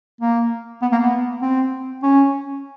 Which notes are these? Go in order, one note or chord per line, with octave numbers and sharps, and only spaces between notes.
A#3
B3
A#3
B3
C4
C#4